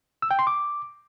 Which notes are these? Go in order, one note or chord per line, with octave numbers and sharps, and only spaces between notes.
E6
G5
C6
D6